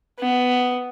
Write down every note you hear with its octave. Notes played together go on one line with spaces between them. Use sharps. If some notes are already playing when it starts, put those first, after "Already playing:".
B3